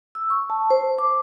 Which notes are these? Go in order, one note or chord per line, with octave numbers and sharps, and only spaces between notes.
E6
C#6
A5
C5
D6